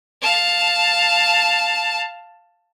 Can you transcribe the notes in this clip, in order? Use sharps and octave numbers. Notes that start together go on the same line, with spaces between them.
F5 A5